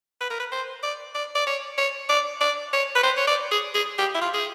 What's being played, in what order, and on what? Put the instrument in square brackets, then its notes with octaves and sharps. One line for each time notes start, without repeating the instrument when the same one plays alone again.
[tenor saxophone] B4
A#4
B4
C5
D5
D5
D5
C#5
C#5
D5
D5
C#5
B4
C5
C#5
D5
G#4
G#4
G4
E4
F4
G#4